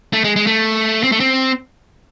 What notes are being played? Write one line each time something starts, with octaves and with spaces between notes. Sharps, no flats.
A3
G#3
G#3
A3
C4
A3
C4